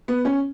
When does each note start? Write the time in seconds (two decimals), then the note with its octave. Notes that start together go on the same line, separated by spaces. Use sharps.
0.08 B3
0.25 C#4